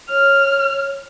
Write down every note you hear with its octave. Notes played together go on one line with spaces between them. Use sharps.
C#5 F6